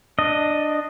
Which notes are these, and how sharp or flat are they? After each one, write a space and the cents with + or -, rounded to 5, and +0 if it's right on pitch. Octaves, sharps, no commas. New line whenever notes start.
D4 +15 D#5 +0